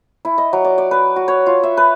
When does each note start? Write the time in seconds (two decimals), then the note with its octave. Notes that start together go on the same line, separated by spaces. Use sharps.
0.25 E4
0.38 D#5
0.53 F#3
0.64 D5
0.78 D5
0.91 B4
1.16 F#4
1.28 C#5
1.46 F4
1.63 E5
1.77 B4